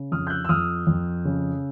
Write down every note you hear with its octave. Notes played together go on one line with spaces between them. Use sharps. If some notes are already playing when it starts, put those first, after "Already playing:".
Already playing: C#3
F2 D#6 F6
G6
E6 F#6
E6
F2 D#6 F6
F2
C#3